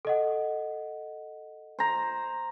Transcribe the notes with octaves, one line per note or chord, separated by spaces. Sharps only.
A4 D#5 F#5
C5 A#5